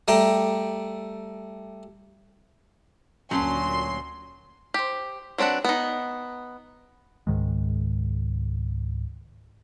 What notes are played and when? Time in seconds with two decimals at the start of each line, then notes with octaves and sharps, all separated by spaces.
0.08 G3 A3 G5 A#5
3.31 D2 A#2 F#3 C#4 C6
4.74 G4 C5
5.38 F#3 C4 D4 B4 F#5
5.65 B3 D#4
7.27 C#2 G#2 D#3 G#3